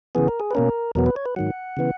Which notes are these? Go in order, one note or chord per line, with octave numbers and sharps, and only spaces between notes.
C#3 E3 B3 G#4
A#4
G#4
B4
B2 A#3 C#4 A#4
E2 B2 F#3 B3 A#4
B4
C#5
B4
G#2 D#3 F#3 F#5
C#3 E3 B3